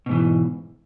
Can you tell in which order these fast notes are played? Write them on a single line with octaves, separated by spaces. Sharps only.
B2 G#2 E3